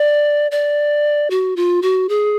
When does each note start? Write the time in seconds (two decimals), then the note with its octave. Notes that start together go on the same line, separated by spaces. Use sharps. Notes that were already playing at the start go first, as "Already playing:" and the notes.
Already playing: D5
0.51 D5
1.30 F#4
1.56 F4
1.82 F#4
2.09 G#4